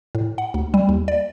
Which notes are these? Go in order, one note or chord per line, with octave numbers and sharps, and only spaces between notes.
A2
F#5
D2
G3
D#2
D5